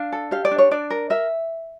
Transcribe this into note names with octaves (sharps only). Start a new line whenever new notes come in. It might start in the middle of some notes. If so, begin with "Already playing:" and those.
Already playing: D4 F5
A4
G4 F5
D5
D4
C#5
D4 D5
A#4
A#4 E5